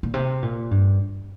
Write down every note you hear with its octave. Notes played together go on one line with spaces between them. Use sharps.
A#2
C3
A#2
G2